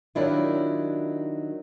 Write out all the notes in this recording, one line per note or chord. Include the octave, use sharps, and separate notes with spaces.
D#3 F#3 D4 E4 F4